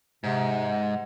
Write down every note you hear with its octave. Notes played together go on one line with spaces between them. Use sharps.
G#2 C3 F#5